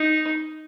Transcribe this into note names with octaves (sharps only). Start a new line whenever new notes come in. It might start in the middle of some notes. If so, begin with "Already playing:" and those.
Already playing: D#4